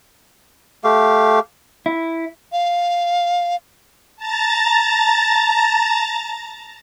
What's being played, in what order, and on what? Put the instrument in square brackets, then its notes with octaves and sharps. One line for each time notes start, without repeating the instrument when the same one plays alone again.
[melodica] A3 G4 F5
[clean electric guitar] E4
[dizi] F5
[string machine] A5 A#5 A6